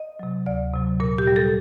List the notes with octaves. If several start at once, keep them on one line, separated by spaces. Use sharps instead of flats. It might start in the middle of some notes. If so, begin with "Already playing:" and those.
Already playing: D#5
C3 F#3
D2 D5
C3 F#3
A#2 A#4
G4
G3
A4